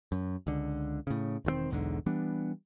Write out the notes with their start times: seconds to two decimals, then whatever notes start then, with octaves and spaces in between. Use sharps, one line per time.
0.12 F#2
0.47 C#2 D3
1.07 A2 C#3
1.45 E1 D#3 F#3 C4
1.70 B1 E2 G#2 D3
2.06 E3 G3 B3 D4